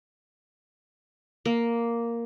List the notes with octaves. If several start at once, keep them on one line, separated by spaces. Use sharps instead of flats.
A#3